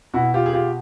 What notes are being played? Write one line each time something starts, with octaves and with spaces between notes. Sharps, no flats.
B2 E4 F#4
F4 G4
G#4
F4 G4